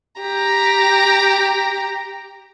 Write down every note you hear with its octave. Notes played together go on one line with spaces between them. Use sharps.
G4 A#5